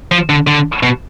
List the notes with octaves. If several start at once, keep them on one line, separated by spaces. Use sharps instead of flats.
F3
D3
D3
B2